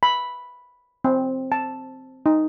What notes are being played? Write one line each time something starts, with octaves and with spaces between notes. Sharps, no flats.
B5
C4
A5
D#4